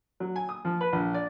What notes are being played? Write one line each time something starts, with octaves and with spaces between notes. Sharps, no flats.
F#3
G#5
D#6
F3
B4
A#1
D5